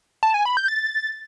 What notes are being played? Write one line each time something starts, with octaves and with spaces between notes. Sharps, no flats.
A5
G#5
B5
G6
A6